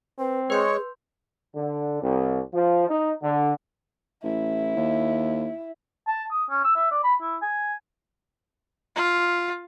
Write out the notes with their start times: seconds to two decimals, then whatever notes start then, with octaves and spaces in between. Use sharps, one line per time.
0.19 C4 B4
0.50 G#3 G#4 B4 C#5 C6 G6
1.55 D3
2.02 C2
2.53 F3
2.88 D#4
3.22 D3
4.24 A1 E4
4.76 D#2
6.08 A5
6.31 D#6
6.50 C#4
6.64 E6
6.76 E5
6.92 D5
7.04 B5
7.22 E4
7.42 G#5
8.96 F4